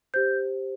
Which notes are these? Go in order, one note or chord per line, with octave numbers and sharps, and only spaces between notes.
G4 C5 G6